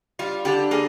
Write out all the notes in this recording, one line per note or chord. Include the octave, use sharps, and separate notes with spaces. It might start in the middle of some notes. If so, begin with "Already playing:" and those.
G3 F4
D3 G4
A#3 G#4